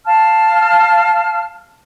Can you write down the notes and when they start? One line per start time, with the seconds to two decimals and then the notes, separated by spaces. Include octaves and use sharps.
0.05 F5 A5 F6